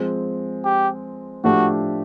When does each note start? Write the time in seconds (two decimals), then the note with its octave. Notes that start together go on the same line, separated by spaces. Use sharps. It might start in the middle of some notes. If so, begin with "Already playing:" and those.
Already playing: F3 G#3 C4
0.65 G4
1.44 A2 F3 A3 D4 F#4 G4